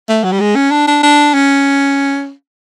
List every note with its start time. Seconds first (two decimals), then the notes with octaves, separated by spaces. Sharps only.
0.09 A3
0.24 F#3
0.32 G3
0.40 G#3
0.56 C#4
0.71 D4
0.88 D4
1.03 D4
1.34 C#4